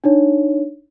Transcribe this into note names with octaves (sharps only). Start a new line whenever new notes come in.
D4 D#4 C#5